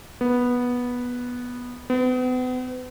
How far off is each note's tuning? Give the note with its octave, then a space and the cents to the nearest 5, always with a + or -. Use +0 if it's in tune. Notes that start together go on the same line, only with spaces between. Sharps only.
B3 -10
B3 +40